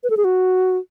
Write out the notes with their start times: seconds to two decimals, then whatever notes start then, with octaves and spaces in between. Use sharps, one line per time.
0.04 B4
0.10 A4
0.17 G#4
0.24 F#4